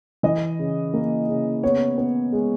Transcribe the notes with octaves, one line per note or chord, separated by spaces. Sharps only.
E3 D#5
C#3
A#3
C#3
B3 C#5
B3
G#3